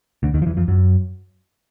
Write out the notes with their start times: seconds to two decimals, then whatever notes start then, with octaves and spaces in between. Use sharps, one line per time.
0.23 D2 D3
0.34 D#2 D#3
0.42 F3
0.46 E2 E3
0.57 F2 F3
0.68 F#2 F#3